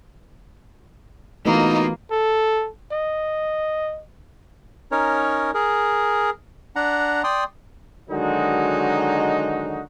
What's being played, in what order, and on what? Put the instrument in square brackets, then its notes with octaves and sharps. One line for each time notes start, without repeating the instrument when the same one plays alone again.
[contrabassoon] B2 [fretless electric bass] E3 A3 [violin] A#3 F4 [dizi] D#4
[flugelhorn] A4
D#5
[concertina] C#4 D#4 A#4 C#5
G#4 A#4
D4 F#5 A#5
D5 G5 C6 D#6
[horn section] D3 D#3 F#3 G#3 D#4 F#4